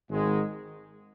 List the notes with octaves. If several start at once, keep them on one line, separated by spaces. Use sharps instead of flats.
G#1 G#2 D#3 G#3